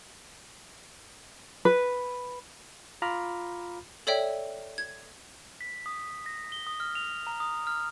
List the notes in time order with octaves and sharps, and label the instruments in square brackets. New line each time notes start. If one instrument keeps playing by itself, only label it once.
[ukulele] B4
[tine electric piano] F4 A#5 B5 D6 F6
[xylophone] A4 C#5 D5 E5 G5
G#6
[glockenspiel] B6
D#6
A#6
G7
D#6
F6
F7
A#5
D#6
F6